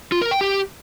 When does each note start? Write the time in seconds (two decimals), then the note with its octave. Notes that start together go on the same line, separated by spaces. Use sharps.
0.12 F4
0.22 A#4
0.31 G5
0.41 G4